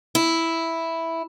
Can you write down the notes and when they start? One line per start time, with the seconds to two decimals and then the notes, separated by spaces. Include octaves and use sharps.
0.15 E4